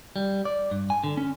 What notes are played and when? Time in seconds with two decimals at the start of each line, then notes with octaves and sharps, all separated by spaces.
0.16 G3
0.45 D5
0.71 G2
0.90 G#5
1.04 D3
1.17 C#4